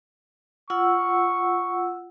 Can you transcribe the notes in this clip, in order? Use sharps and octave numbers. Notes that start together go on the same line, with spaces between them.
F4 F#5 C#6 E6